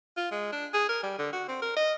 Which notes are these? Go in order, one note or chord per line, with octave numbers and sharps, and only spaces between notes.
F4
G#3
D4
G#4
A#4
G3
D3
F#4
C4
A#4
D#5